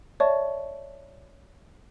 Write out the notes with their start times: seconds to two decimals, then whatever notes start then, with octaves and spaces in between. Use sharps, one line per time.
0.20 C#5 D5 E5 A5 C#6